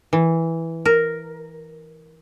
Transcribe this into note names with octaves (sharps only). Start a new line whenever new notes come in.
E3
A#4